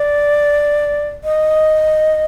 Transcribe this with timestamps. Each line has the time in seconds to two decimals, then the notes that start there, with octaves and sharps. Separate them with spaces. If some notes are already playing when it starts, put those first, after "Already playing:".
Already playing: D5
1.24 D#5